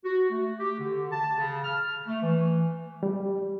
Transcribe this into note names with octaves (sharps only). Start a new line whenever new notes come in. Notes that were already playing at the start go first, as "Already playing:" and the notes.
F#4
A3
G4
D3
A5
C#3
F6
A3
E3
G3